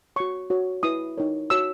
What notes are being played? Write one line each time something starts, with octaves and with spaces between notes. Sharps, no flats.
F#4 C#5 C#6
F#4 C#5
E4 B4 D#6
D#4 A#4 C#5
F#4 C#5 E6